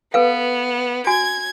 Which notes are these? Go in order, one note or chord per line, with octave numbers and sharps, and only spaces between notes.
B3 A4 B4 F5
F#4 G#5 G#6